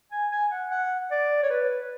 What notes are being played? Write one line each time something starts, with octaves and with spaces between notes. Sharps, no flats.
G#5
G#5
F#5
F#5
D5
C#5
B4